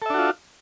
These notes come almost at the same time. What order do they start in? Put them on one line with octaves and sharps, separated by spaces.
A4 E5 D4 F#4 F4